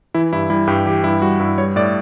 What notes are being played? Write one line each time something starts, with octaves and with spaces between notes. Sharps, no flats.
E3 E4
G2 E4
G3 E4
G2 G4
E3 G4
G2 E4
G3 F#4
G2 E4
G3 C#5
A2 D5